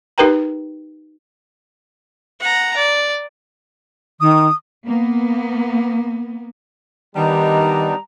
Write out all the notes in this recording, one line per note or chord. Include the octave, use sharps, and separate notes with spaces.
D#4 G4 A#4 B4 G5 A#5
F#5 A#5
D5
D#3 D#6
A#3 B3
D#3 G3 B3 D4 D#4 A#5